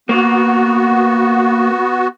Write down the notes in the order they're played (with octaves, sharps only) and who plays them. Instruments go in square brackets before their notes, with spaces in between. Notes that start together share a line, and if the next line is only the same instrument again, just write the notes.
[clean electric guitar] A#3 [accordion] B3 F#4